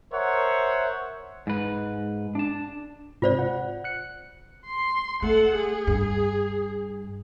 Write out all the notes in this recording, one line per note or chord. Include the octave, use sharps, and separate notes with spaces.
A#4 C5 C#5 E5 F#5
G#2 B4
D4 A5
G#2 C3 F4 C5 D5
F#5
F#6 C#7
C6
A3 A4 F#5
G#4
G2